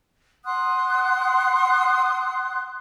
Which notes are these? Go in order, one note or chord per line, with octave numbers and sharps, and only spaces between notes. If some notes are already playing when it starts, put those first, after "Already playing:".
F#5 C6 D#6 F#6